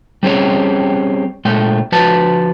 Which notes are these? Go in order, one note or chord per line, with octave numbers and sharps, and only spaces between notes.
G3 C4 C#4 G#4 C#5
A#2 G#3 A3 G5
F3 F#4 B4 A5